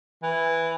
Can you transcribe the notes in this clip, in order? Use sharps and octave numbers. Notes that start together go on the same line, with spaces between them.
E3